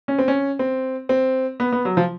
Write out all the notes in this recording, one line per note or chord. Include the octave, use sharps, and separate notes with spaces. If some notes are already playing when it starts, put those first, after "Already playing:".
C#4
C4
C#4
C4
C4
B3
B3
F#3
F3